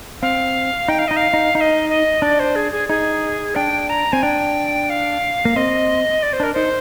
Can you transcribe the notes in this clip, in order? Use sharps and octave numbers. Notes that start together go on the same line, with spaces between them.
C4 F5
D#4 G5
F5
D#4 D#5
F5
D#4
D#4 F5
D#5
D#5
D4 D5
C5
G#4
G#4
D#4 G#4
D4 G5
A#5
C4 G#5
D4 G5
F5
A#3
C4 D#5
D5
C5
D4 A#4
D#4 C5